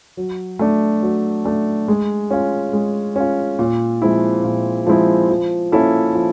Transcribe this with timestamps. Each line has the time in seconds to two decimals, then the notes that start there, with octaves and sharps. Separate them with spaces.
0.17 F#3
0.59 A3 D4
1.02 F#3
1.45 A3 D4
1.88 G#3
2.31 C#4 F4
2.73 G#3
3.16 C#4 F4
3.59 A#2
4.02 F3 G#3 C4 E4
4.44 A#2
4.87 F3 G#3 C4 E4
5.30 F3
5.72 A#3 C#4 E4 A4
6.15 F3